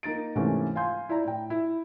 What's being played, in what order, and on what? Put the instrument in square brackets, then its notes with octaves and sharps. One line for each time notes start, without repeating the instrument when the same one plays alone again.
[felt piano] A#3 D#4 A6 D7
G#2 C3 E3 A3 A#3 C#4
F5 G#5 C6 G6
E4 D5 A#5
A2 G5
E4